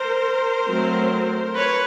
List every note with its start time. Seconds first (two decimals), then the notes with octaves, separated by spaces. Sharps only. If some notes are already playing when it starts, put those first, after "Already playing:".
Already playing: A#4 C5
0.67 F#3 A3 C4
1.55 B4 C#5